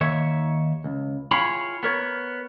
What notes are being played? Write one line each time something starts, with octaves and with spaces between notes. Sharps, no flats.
D#2 D#3 C#5 E5
C#2
E4 F4 G#4 C#5 G5 B5
B3 A#4 C#5